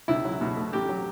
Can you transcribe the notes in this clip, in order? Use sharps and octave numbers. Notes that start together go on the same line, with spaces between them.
C#2 E4
F#3
B2
A3
A1 G4
F#3